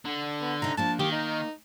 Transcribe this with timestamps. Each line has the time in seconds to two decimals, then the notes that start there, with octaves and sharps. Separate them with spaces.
0.05 D3
0.41 B3
0.62 C3 D#4 A#5
0.77 F3 A#3 D4 A5
0.99 D#3 A#3 G4
1.12 D#4